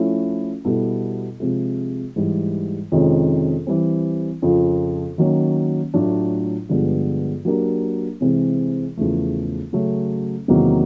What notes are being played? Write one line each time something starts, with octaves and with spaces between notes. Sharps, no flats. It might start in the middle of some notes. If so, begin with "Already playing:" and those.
Already playing: F3 A3 C#4 E4
B2 G3 B3 E4 A4
C3 F3 G#3
G#2 E3 G3
F2 C3 D#3 G#3 C#4
E3 G3 C4
F2 C#3 F3
D#3 F#3 A#3 C#4
A2 F#3 A3 D4 F4
G2 D3 F3 G#3 B3
F#3 A#3 D4 G4 A#4
C3 E3 G#3 C4
E2 C#3 F3 A3
C#3 F#3 A3 C#4
E2 C3 D#3 F#3 A#3